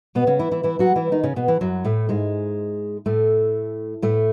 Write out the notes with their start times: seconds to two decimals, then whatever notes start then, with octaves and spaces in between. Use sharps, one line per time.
0.15 B2 B3
0.27 C#3 C#4
0.39 E3 E4
0.51 E3 E4
0.63 E3 E4
0.79 F#3 F#4
0.96 E3 E4
1.12 D#3 D#4
1.23 C#3 C#4
1.36 B2 B3
1.48 E3
1.61 F#2 F#3
1.85 A2 A3
2.09 G#2 G#3
3.06 A2 A3
4.02 A2 A3